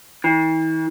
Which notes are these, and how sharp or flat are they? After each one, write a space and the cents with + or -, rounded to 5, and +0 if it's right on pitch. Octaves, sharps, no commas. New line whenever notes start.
E3 -45